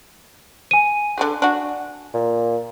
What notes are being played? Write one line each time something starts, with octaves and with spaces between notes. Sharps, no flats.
G#5 D#7
D3 G3 G#4
D4 F#4
A#2